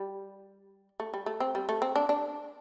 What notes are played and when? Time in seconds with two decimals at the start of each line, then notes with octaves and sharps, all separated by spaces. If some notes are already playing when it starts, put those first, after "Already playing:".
Already playing: G3
1.00 A3
1.14 G3
1.26 A3
1.40 C4
1.55 G3
1.69 A3
1.82 C4
1.96 D4
2.09 D4